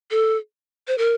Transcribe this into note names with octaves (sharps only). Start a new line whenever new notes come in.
A4
C5
A#4